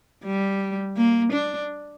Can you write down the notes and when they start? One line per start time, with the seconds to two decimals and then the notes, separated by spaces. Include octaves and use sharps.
0.25 G3
0.97 A#3
1.33 D4